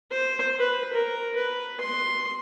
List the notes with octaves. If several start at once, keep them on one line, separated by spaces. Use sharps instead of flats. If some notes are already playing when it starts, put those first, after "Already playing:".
C5
B4
A#4
B4
C6